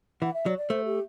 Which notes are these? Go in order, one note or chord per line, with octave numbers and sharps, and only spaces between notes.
E3 F#5
E5
F#3 D5
D5
A3 C5
G4